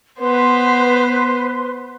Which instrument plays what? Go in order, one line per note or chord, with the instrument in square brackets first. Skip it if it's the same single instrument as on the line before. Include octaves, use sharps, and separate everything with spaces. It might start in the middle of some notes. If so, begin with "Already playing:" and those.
[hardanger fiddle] B3 C5 [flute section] B4 C6